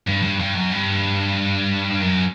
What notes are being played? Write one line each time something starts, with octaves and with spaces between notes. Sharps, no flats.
G2
G2
G2
F#2
G2
F#2